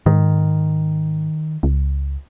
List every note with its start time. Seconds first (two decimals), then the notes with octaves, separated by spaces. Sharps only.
0.06 G#2 D#3
1.63 C#2